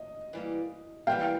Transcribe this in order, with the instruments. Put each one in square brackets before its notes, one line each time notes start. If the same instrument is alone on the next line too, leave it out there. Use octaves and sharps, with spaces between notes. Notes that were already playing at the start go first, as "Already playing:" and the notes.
Already playing: [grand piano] D#5
[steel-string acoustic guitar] E3 G3 A#3
[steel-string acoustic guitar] E3 G3 A#3 [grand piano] F5 G5